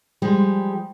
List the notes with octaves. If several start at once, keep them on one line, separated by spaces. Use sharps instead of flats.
F3 G3 G#3 G4